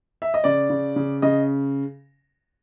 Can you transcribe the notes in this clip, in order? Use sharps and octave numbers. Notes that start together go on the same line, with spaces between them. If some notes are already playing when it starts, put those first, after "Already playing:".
E5
D#5
C#3 D5
C#3
C#3
C#3 D#5